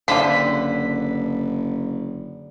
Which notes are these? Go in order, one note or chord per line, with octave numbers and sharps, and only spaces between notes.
F#1 D3 F3 F4 B4 C5 B6